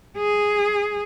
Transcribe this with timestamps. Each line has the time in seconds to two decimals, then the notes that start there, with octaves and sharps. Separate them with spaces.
0.18 G#4